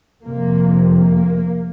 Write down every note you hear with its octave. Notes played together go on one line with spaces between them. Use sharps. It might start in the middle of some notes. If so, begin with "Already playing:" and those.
F2 C3 A#3
A#3